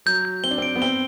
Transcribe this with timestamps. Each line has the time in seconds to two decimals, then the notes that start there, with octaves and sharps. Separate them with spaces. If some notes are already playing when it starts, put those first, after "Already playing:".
0.06 F#3 G6
0.25 G6
0.44 C4 G7
0.51 D4
0.58 C4 D7
0.76 B3
0.82 C4 G7